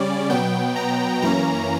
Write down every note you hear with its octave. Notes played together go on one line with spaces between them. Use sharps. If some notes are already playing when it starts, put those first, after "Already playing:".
Already playing: C#3 G3 C#4 D5
B2 F#3 B3 G5
A#5
F#2 E3 A#3 C#4 A#5